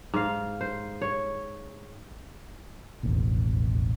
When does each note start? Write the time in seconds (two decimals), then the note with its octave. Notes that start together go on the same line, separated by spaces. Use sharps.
0.14 G#2 F5
0.61 C5
1.02 C#5
3.03 E1 A1 D#2